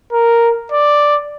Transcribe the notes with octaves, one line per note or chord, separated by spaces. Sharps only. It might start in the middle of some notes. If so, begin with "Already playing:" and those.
A#4
D5